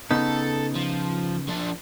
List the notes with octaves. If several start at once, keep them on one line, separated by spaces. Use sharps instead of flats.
C#3 B3 D#4 A4
F3
F3 D4